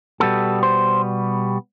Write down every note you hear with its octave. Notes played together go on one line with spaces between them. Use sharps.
B2 G3 B3 A4
C5